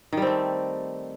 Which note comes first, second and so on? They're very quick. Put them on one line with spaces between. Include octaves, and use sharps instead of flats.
D#3 G3 C4 A3